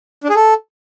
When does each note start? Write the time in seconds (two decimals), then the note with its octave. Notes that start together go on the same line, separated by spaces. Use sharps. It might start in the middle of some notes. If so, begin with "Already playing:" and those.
0.24 D4
0.30 G#4
0.35 A4